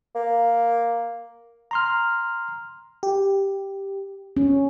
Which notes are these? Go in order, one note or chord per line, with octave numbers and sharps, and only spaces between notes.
A#3
A#5 C6 F6
G4
C#4